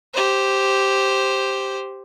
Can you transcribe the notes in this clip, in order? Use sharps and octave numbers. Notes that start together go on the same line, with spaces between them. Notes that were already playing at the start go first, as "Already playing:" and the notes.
G4 C5